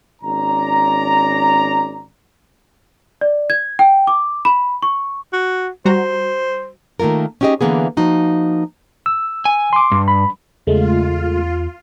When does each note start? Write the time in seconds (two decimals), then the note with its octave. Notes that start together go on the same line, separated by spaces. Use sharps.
0.22 G#1 C#4 D5 A#5
3.21 D5
3.50 G#6
3.79 G5
4.07 D6
4.45 B5
4.83 C#6
5.33 F#4
5.85 G3 F#4 C5 A#5
7.00 D#3 A3 A#3 F4 A#4
7.41 C#4 D#4 G4 G#4 D#5
7.61 D3 E3 A#3 B3 G#4
7.97 F3 A#3 D#4 F#4
9.06 E6
9.45 G#5
9.73 C6 D6
9.92 G2
10.08 B5
10.67 E2 C#3 G#3 A3 F4